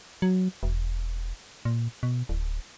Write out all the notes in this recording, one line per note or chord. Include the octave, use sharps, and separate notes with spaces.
F#3
E1
A#2
B2
D1